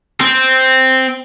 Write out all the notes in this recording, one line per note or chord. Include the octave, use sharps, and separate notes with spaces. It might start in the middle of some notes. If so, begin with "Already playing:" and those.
C4